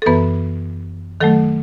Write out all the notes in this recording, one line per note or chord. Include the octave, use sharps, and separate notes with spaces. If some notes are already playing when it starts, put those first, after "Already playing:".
A4
F#2 E3 B3 B4
D#3 F#3 A3 A4